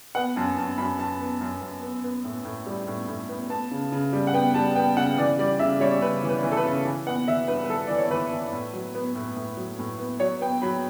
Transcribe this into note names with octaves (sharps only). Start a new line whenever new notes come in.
B3 F#5
F#2 A5
F#2 A5
F#2 B5
F#2 A5
B3
F#2
F#2
B3
B3
A2
A2
G3
A2
A2
B3
B3 A5
C#3
C#3
G3
F#5
B3 G5
G3 A5
B3 G5
C#3 F#5
E3 D5
G3 D5
C#3 E5
G3 C#5
C#3 B4
E3
B4
E3
A4
B4
C#3
E3
B3 F#5
E3 E5
G2 B4
B4
E3 A4
E3 D5
C#5
E3 B4
E3
A2
F#3
B3
A2
A2
F#3
A2
B3
F#3 C#5
B3 G5
F#3 B5